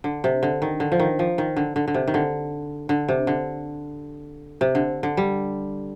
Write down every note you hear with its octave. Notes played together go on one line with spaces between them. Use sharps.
D3
C3
D3
D#3
D3
F3
D#3
F3
D#3
D3
D3
D3
C3
D#3
D3
D3
C3
D3
C3
D3
D3
G3